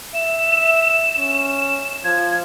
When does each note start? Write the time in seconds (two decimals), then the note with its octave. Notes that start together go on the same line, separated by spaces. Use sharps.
0.15 E5 E7
1.18 C#4
2.04 F3 G#6